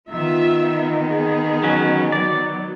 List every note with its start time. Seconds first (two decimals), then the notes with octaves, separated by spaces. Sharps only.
0.10 D#3 B3 F4 E5
1.11 G#4
1.63 F#3 C#4
2.12 F#3 D5